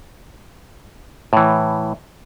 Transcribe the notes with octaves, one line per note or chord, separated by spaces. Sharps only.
A2 E3